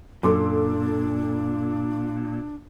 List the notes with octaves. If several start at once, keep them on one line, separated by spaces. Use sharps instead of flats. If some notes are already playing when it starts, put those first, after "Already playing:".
F#2 A#2 D4 A4 C6 D6